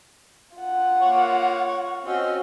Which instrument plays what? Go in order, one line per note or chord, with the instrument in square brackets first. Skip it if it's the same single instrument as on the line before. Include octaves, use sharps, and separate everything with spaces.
[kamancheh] F4 F#5
[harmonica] A#3 C#5
[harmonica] C4 C#4 [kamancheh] F#4 D#5